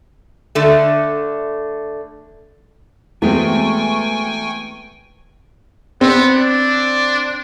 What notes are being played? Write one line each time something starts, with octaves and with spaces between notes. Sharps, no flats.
D3 A3
E2 G#3 A3 C4 F#4 G5 G#5 C#6
B3 C4
D4